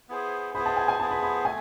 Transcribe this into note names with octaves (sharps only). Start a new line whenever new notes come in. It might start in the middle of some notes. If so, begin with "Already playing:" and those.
B3 E4 G#4 C5
B3 E4 G#4 C5 B5
A5
G#5
G#5
B3 E4 G#4 C5 A5
B5
B5
A3 C4 G#5